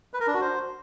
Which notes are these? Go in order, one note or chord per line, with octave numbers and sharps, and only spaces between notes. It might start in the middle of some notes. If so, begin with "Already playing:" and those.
B4
A#4
D4
F#4
C5